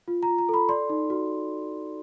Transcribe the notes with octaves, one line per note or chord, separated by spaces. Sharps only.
F4
A#5
F4
A#5
A4 B5
D5 C6
D#4
F#4